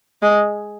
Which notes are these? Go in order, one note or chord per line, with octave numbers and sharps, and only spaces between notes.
G#3